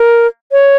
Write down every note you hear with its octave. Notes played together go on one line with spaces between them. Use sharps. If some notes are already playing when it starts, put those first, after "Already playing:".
Already playing: A#4
C#5